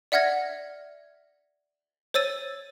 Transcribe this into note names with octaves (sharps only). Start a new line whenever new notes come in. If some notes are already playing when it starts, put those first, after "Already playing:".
D5 E5 F#5 F6 G#6 A#6
C5 C#5 E6 A6 D#7